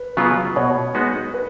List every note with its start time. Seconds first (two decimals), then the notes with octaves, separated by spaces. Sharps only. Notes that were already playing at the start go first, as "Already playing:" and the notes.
Already playing: B4
0.17 C#3 F#3 B3 F4
0.56 B2 C#5
0.95 G#3 B3 D#4 F#4
1.34 B4